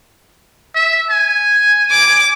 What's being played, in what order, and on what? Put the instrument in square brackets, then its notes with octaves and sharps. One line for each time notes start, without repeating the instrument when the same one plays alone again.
[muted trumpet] E5
G#5
[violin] D6